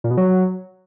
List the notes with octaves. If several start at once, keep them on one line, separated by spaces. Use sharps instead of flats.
A#2
B2
F#3